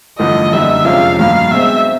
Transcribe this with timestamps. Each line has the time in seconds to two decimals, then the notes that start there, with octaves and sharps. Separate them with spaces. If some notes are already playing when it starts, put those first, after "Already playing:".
0.19 A1 G2 D3 F3 A3 D#5
0.52 F#2 D3 G3 A#3 D#4 E5
0.85 F2 C3 F3 G#3 C#4 F5
1.18 G2 D#3 F#3 A#3 F5
1.51 B2 G#3 C4 E5